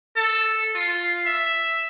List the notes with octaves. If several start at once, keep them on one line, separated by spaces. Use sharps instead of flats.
A4
F4
E5